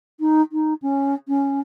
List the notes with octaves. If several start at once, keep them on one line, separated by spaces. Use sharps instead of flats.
D#4
D#4
C#4
C#4